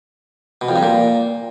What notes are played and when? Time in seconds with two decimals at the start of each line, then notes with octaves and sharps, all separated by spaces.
0.61 B2
0.69 F2
0.76 G2
0.83 A#2